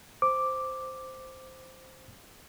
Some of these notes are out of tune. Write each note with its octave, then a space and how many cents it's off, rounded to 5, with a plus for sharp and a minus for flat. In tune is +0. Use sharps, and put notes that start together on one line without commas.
C5 -5 D6 +0